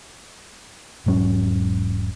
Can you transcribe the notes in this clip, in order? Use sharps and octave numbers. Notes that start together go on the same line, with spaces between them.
E1 G#2 F#3 C#4